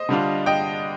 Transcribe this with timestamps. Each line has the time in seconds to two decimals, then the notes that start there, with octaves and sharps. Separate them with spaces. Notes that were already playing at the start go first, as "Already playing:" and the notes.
Already playing: C5 D#5
0.09 D3 G3 D4 F4
0.46 D#5 G5